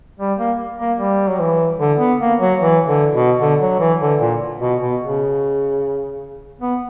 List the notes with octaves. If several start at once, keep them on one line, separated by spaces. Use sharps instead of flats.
G3
A#3
A#3
G3
F#3
E3
D3
B3
A#3
F#3
E3
D3
B2
D3
F#3
E3
D3
A#2
B2
B2
C#3
B3